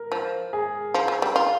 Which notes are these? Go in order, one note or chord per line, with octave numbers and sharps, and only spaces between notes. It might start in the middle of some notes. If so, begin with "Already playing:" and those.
Already playing: A#4
F3
G#4
F3
F3
G3
F4